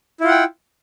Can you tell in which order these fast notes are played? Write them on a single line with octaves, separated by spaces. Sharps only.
E4 F4 F#5 G5